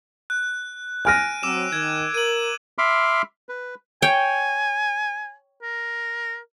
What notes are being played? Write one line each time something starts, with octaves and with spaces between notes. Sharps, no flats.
F#6
G#5 F6 F#6 A#6 D7 D#7
F#3 C4 D6 E6 E7
D#3 G#6
A#4 D#7 F#7
E5 B5 C6 D6 F6
B4
C#5 G5 G#5
A#4